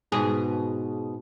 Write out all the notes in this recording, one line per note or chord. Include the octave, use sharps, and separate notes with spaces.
G#2 B2 G#4